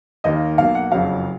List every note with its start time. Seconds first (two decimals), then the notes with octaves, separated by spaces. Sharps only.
0.24 D#2 D#3 A#3 D#5
0.58 B1 B2 A#3 F5
0.75 F#5
0.92 F#1 F2 C#3 F#3 F5